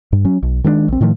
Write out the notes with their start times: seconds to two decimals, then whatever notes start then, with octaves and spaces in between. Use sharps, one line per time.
0.12 G2
0.25 F#3 C#4
0.43 B1
0.64 D#3 G#3 A3 D4
0.88 A#1 C4
1.01 A2 D#3 F3 A3